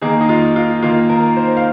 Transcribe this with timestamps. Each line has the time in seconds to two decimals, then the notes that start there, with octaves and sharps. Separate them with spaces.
0.02 D#3 A#3 G#4
0.21 D#4
0.29 F4
0.56 F4
0.82 D#3 A#3 F4
1.10 A#4
1.36 C5
1.57 F5